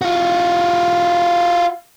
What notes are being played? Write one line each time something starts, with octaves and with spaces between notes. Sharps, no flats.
F4 F#4